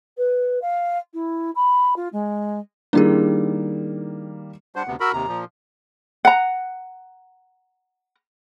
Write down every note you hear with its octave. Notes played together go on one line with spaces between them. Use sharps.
B4
F5
E4
B5
F4
G#3
D#3 G3 A#3 D4 E4 G#4
G3 D4 C5 F#5
D2 C3 B3
F#4 A#4 B5 E6
D#2 C3 A#5
A#2 F3
F#5 A#5